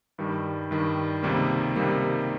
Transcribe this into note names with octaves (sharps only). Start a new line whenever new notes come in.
G2 D#3 G3
G2 D#3 G3
C#2 C3 D#3 G3 A#3
C#2 C3 D#3 G3 A#3